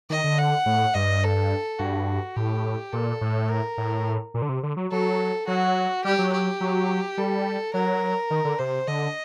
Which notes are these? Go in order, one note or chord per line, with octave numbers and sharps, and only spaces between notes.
D#3 D#5
D3
F#5
A2
G2 D#5
A4
G2 F#4
A2 G4
A#2 A4
A2
A#4
A2
A#2
D3
C3
D3
F#3
F#3 A4
F#3 F#4
G3 G4
F#3
G4
F#3
G3 A4
F#3 A#4
D#3
D3
C3 C5
D3 D#5